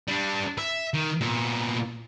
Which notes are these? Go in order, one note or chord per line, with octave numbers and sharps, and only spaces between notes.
G3 D4
E5
D#3
A#2 B3